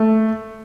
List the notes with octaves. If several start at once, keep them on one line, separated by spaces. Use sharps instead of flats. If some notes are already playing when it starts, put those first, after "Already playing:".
Already playing: A3